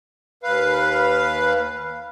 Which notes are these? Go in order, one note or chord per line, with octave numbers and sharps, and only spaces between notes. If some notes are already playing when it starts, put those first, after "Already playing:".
D#2 B4 F5